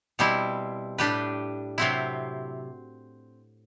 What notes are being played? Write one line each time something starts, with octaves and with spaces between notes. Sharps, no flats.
B2 G3 C4 E4
A2 G3 D4 G4 B4
C3 F#3 C4 E4